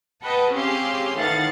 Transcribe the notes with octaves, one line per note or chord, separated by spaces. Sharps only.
B4 D#5 F#5 G5 A5
C4 C#4 G4 G#4 F5 C6
A2 D#3 E3 F5 F#5 A6